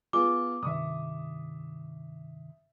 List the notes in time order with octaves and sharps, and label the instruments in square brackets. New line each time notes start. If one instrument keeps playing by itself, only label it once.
[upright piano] B3 F4 G#4 [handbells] D6
[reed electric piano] G2 C3 D#3 [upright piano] E5 C#6 D#6